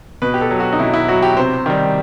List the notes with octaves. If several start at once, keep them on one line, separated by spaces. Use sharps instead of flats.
B2 B4
G4
A4
F#3
F#4
D#4
B2 E4
E4
F#3 F#4
G4
C3 C5
D#3 G3